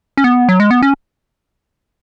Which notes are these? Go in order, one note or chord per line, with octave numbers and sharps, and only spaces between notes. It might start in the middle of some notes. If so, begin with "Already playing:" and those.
C#4
B3
F#3
G#3
B3
C#4